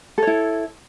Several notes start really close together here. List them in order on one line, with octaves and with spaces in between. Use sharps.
A4 C#5 E4